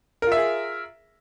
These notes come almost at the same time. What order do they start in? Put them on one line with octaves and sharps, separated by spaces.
A#4 F4 E5 G#4